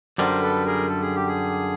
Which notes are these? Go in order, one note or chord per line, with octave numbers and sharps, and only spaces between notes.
F#2 D3 G3 A#4 C5
A4 B4
G#4 A#4
A4
G#4
G4
G#4